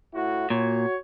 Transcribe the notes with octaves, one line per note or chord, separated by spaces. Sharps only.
A2 E4 F#4
A#2 F#4 C#5